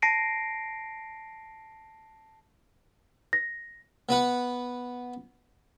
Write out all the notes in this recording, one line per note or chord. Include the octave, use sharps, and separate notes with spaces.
A5 A#6 C7 D7
A#6
B3 B4 F#5